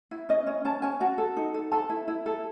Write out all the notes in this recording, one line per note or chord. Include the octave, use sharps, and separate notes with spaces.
E4
C#4 D#5
C#4
C#4 A5
C#4 G#5
F#4 A5
A4
D#4
A4
A4 A5
E4
E4
A4